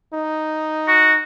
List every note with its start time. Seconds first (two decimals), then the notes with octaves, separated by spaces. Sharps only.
0.13 D#4
0.88 F#4